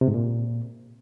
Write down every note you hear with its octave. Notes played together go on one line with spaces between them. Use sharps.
C3
G#2
A#2